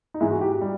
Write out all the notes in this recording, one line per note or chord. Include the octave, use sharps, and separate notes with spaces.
D#4
G#2 E3 G#3 E4
F#4
G4
G3